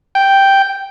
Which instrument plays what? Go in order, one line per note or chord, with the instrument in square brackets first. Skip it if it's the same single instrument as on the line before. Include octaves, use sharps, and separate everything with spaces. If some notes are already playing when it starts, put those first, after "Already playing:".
[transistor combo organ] G5